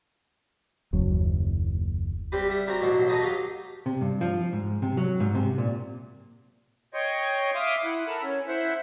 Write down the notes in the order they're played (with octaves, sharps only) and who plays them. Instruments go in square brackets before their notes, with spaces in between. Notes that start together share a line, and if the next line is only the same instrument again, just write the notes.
[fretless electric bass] F#1 D#2 F#3
[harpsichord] G3 C4 G4 B4
G3 E5 F#5
C4 F#4 A#4 D5 G5 B5
A1 B2 F#3 C5
D#4 F#4 A4 B4 D#5
F#3 G4 F5
[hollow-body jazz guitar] C3
G2
F3
G#2
C3
F#3
G#2
C3
A#2
[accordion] C#5 D#5 G5 C6 C#6
E5 F5 C6 D6 D#6
E4 F#5
A4 A#4 B5 E6
C#4
E4 C5 E5 F#5